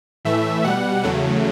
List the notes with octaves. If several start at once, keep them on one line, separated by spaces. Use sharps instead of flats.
A2 E3 A3 E5
B2 G3 F#5
E2 C#3 F#3 A3